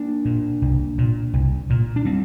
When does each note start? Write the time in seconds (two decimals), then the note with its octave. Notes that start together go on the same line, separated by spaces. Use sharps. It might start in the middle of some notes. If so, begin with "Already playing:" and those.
Already playing: A#3 D4
0.25 A#2
0.62 C2
0.98 A#2
1.33 C2
1.70 A#2
1.96 D4
2.05 G3 C4